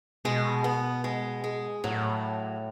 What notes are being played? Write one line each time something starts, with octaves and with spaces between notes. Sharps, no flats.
B2 G#3
B3
G#3
G#3
A2 F#3